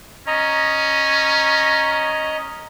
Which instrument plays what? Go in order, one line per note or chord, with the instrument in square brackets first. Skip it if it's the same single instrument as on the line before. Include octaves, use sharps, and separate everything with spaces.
[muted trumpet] C#4 [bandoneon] D#5 A#5